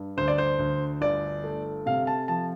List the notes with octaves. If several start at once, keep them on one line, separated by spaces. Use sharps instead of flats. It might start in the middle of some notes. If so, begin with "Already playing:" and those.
Already playing: G2
D2 C5
D5
C5
D2
G1 D5
A3
C3 F5
A5
F3 A5